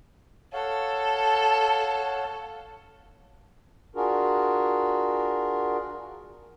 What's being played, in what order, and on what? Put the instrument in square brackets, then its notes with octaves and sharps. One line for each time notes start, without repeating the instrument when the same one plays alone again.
[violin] A4 [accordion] C#5 F5 F#5
[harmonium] D4 F4 F#4 G#4 A#4